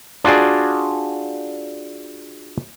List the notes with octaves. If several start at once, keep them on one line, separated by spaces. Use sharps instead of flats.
D4 F4 F#4 G#4 D5